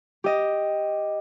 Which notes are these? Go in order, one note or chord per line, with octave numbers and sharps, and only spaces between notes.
G4 D#5